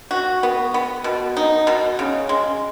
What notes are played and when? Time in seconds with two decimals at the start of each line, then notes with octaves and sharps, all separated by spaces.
0.11 F#4
0.43 B3
0.74 B3
1.04 B2
1.37 D#4
1.67 B2
1.99 C#3
2.29 G#3